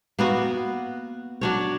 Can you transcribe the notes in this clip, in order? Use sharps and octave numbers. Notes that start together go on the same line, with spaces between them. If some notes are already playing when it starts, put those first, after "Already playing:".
A#3 B3 F#4
F#3 D4 C#5